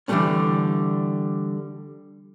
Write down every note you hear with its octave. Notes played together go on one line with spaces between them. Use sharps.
D3 E3 F3 G3 A3 C#4